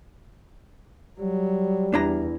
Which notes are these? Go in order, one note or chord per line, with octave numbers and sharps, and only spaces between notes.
F#3 G3
E2 D4 E4 A#5